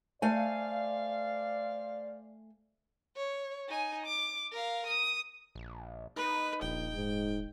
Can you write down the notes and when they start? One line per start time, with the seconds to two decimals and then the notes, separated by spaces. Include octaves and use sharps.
0.22 A3 C5 D5 F5 G#5
3.16 C#5
3.69 D#4 G#5
4.06 D6
4.51 A#4 F5
4.87 D#6
5.55 A#1
6.16 D#4 B4
6.62 D#1 A#1 G5
6.94 G#2